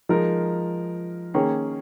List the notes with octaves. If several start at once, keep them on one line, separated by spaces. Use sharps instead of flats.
F3 G#3 D#4 A#4
D#3 A#3 C#4 G#4 C#5